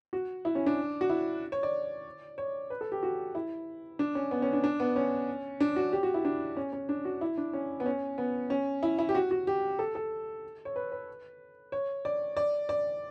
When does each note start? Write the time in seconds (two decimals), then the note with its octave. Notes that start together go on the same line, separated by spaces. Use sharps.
0.13 F#4
0.45 E4
0.55 C#4
0.66 D4
1.01 F#4
1.10 E4
1.52 C#5
1.63 D5
2.38 C#5
2.70 B4
2.81 A4
2.92 G4
3.03 F#4
3.35 E4
3.99 D4
4.15 C#4
4.31 B3
4.42 C#4
4.53 D4
4.64 D4
4.80 B3
4.96 C#4
5.60 D4
5.76 F#4
5.93 G4
6.03 F#4
6.14 E4
6.25 D4
6.57 C#4
6.73 C#4
6.89 D4
7.05 F#4
7.21 E4
7.38 D4
7.53 C#4
7.80 B3
7.86 C#4
8.18 B3
8.50 C#4
8.83 E4
8.99 E4
9.09 G4
9.15 F#4
9.31 F#4
9.47 G4
9.79 A4
9.95 A4
10.65 C#5
10.76 B4
10.92 B4
11.72 C#5
12.05 D5
12.37 D5
12.69 D5